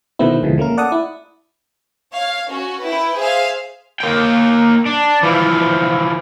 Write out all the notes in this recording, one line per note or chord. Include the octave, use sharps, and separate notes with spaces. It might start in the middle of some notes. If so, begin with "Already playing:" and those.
B2 D#3 A3 B3 C4 E4
D2 B2 E3 F3 G#3
A3 A#3 C#4 A#4
D5 F#5 A5 D#6
E4
C#5 F5
C#4 F#4
E4 B4 G5
G#4 C5 E5 F5 G#5
A#3 G5
D4
E3 F3